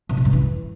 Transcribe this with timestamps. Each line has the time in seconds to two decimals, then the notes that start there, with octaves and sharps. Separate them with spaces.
0.09 B2
0.17 C3
0.25 G2
0.33 E3